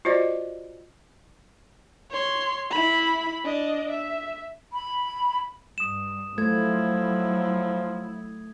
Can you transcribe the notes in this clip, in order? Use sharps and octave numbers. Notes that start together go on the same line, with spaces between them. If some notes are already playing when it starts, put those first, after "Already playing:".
F4 F#4 C5 D5 D#5
C#5 C6
E4 B5
D4 D#5
E5
B5
G2 D#6 E7
F3 F#3 A3 E4 G#6